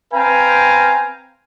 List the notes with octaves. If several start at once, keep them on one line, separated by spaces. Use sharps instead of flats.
C4 B4 F5 G5 G#5 A#5